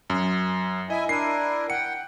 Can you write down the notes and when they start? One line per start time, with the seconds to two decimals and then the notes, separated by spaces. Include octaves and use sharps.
0.10 F#2
0.90 E4 D#5 E5 G#5
1.09 D4 E4 A#4 C7 D#7
1.70 F#5 G5 C#7